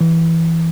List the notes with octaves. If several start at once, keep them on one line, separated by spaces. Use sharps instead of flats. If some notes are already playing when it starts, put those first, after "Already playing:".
E3